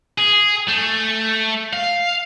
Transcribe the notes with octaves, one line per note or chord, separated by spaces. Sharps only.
G#4
A3
F5